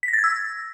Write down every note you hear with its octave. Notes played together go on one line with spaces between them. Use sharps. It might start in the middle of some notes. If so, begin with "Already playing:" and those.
B6
A#6
A6
G#6
E6